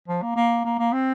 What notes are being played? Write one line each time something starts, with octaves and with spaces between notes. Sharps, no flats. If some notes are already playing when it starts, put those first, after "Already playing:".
F3
A#3
A#3
A#3
A#3
C4